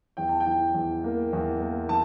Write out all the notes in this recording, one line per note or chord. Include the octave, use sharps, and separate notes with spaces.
E2 G5
A5
G5
E3
E2
A#3
E2
A#3
E3 A5